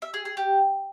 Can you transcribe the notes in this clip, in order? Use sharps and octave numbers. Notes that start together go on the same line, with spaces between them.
E5
G#4
G#4
G4